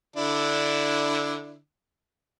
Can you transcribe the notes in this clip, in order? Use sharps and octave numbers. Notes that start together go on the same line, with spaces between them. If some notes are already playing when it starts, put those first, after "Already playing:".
D3 D4 E4